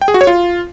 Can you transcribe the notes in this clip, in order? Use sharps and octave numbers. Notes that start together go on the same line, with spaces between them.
G5
G#4
F#4
C#5
F4